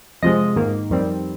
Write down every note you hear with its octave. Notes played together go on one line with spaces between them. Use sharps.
F2 C3 F3 G#3 D#5
G#2 D#3 A#3
F2 D#3 G3 C4